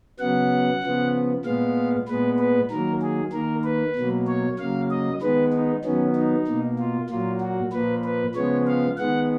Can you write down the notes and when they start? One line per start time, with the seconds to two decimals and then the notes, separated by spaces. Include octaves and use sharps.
0.19 C#3 F#3 B3 F#5
0.83 C#3 F3 B3
1.45 A#2 G#3 B3 F5
2.08 A#2 G#3 B3 B4
2.38 B4
2.70 D#3 F#3 A#3 A#4
3.02 G#4
3.33 D#3 A#3 A#4
3.64 B4
3.96 B2 F#3 A#3
4.27 C#5
4.58 C#3 F#3 A#3 F5
4.91 D#5
5.22 D#3 G#3 B3 B4
5.53 D#4
5.85 D#3 F#3 B3 C#4
6.16 D#4
6.48 B2 A#3
6.79 F4
7.09 A#2 F#3 A#3 F4
7.41 F#4
7.72 A#2 F3 A#3 B4
8.04 B4
8.35 C#3 F3 G#3 B3 C#5
8.67 F5
8.98 D#3 G#3 B3 F#5